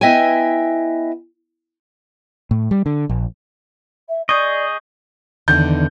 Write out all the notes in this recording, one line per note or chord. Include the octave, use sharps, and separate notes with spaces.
B3 E4 D#5 E5 G5 G#5
A2
G3
D3
A#1
E5
G#4 D5 D#5 C#6 D#6 G6
E2 D3 D#3 G6